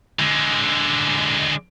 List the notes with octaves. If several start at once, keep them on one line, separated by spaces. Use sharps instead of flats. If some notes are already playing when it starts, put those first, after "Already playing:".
D3 G#3